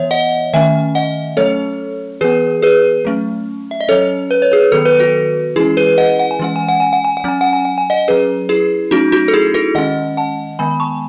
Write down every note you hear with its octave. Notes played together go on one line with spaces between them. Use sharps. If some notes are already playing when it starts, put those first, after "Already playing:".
Already playing: E3 B3 C#5 E5
D#5 F#5
D#3 A3 C#4 E5 G#5
D#5 F#5
F#3 A3 C#4 A4 C#5
E3 B3 G#4 B4
G#4 B4
F#3 A3 C#4
E5
D#5
F#3 C#4 A4 C#5
B4
C#5
G#4 B4
D#3 F#3 B3 A4
B4
F#4 A4
E3 G#3 C#4 E4 G#4
G#4 B4
D#5 F#5
F#5
G#5
E3 G#3 C#4 F#5
G#5
F#5
G#5
F#5
G#5
F#5
F#3 C#4 G#5
F#5
G#5
F#5
G#5
D#5 F#5
F#3 C#4 G#4 B4
E4 G#4
F#3 A3 C#4 D#4 F#4
D#4 F#4
A4
E4 G#4
F#4 A4
D#3 G#3 C#4 D#5 F#5
F#5 A5
D#3 G#3 B3 G#5 B5
A5 C#6